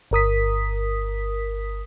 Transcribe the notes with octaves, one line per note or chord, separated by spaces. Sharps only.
G1 A#4 D#6 B6